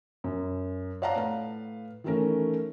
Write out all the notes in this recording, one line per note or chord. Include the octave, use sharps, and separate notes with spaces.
F#2
C#5 D5 F5 F#5 A5 A#5
A2 B4 F5
D#3 E3 A3 C#4 A#4